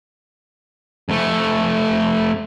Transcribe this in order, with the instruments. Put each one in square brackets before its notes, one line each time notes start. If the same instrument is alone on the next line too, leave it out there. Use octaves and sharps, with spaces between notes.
[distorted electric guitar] F2 A3